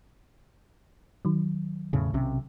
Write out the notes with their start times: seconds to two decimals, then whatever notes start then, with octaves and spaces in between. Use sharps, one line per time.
1.25 D#3 F#3
1.93 E2 A2 C#3
2.14 B1 C3 C#4